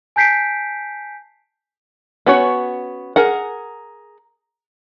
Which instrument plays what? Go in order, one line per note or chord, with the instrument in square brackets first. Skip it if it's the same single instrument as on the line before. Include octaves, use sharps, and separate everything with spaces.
[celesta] G#5 A5 G6 B6 C7 D7
[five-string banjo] B3 C#4 F#4 C#5
G#4 A#4 F#5